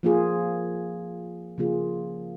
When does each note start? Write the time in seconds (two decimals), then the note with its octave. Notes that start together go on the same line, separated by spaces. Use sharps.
0.03 F3 A#3 F4 G#4
1.58 C#3 F3 A#3 F4 G#4